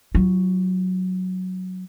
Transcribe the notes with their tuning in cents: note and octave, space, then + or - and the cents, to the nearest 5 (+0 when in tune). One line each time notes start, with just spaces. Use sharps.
F#3 +0 F4 -45